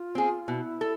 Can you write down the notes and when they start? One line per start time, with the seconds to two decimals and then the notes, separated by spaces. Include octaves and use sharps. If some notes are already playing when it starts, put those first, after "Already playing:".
Already playing: F4
0.15 C4 G#4
0.48 B2 E4
0.81 A4